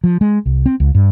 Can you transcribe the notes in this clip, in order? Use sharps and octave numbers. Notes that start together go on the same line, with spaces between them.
F3
G#3
C2
C4
C#2
G2